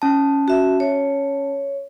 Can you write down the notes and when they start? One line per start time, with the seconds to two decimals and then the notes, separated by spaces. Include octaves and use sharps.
0.02 C#4 A5
0.48 F#4 E5
0.80 C#5